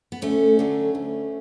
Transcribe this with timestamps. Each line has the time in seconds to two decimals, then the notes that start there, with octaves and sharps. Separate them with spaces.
0.12 B3
0.21 D2 A3 C#4
0.59 D3 F#3
0.95 D2